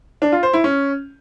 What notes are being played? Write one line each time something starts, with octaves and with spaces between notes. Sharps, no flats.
D4
F4
C5
E4
C#4